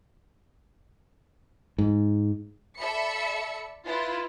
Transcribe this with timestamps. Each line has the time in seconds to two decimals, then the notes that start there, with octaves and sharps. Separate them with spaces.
1.78 G#2
2.79 A4 D5 E5 B5 C#7
3.85 E4 F4 B4